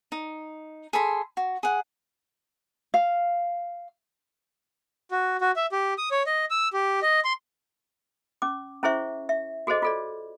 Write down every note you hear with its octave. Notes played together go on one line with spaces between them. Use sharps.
D#4
G#4 A4 B5 C6
F#4
G#4 F#5
F5
F#4
F#4
E5
G4
D#6
C#5
D#5
E6
G4
D#5
C6
C#4 D6
C#4 E4 G#4 C5 E5 C#6
E5
F#4 G#4 A4 C5 D#5
F4 A4 D5